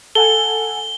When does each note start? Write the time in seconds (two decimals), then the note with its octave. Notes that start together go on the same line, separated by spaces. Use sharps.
0.15 A4 F#5 G#5 G7